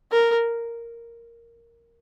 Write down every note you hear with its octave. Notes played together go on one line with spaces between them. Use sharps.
A#4